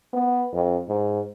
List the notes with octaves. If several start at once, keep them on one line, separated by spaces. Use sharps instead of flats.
B3
F2
G#2